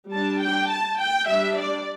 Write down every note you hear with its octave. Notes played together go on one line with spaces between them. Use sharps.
G3 D4 A5
G5
A5
G5
G3 D4 E5
D5